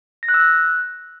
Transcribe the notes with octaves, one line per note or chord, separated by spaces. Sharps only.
A#6
F#6
E6
F#6